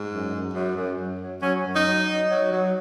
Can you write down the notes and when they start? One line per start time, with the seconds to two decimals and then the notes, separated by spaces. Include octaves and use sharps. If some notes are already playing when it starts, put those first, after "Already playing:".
Already playing: G#2
0.10 F#2
0.33 F#2
0.54 F#2
0.76 F#2
0.98 F#2
1.21 F#3
1.42 F#3 C#4
1.65 F#2
1.76 D#4
1.86 F#3
2.09 F#3
2.31 F#3
2.52 F#3